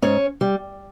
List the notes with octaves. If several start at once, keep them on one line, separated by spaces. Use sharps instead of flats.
G#2 C#4 C#5
G3